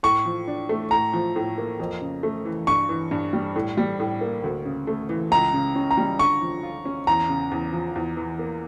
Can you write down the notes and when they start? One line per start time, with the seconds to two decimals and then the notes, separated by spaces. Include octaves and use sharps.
0.03 A2 C#6
0.25 F3
0.47 D4
0.69 A3
0.91 A2 A#5
1.14 F3
1.36 A2
1.58 A#3
1.80 F2
2.02 C#3
2.23 A3
2.45 E3
2.67 G2 C#6
2.89 E3
3.11 G2
3.33 G3
3.56 A2
3.77 G3
4.00 A2
4.21 A#3
4.44 D2
4.65 C#3
4.87 A3
5.09 E3
5.31 C#2 A#5
5.53 C#3
5.75 C#4
5.91 A#5
5.97 G3
6.19 D3 C#6
6.42 F3
6.63 F4
6.85 C#4
7.07 E2 A#5
7.29 C#3
7.51 E2
7.73 F3
7.95 E2
8.17 E3
8.39 A#3